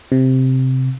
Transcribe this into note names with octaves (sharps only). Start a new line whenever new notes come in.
C3